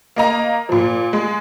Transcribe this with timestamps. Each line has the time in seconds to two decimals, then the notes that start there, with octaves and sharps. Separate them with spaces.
0.16 A#3 D#5 A#5
0.69 A#2 F3
1.13 G#3